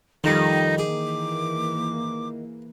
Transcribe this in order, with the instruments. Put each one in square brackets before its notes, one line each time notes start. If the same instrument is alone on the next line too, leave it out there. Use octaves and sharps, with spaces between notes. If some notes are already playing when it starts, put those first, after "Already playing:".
[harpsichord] F2 G3 [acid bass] D#3 [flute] D#4
[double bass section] E3 A#3 [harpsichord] G#4 [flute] D6